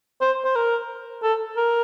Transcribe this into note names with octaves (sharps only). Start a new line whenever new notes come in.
C5
C5
A#4
A4
A#4